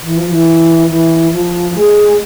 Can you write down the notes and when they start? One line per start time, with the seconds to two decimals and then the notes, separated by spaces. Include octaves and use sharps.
0.03 E3
0.17 F3
0.30 E3
0.89 E3
1.32 F3
1.75 G#3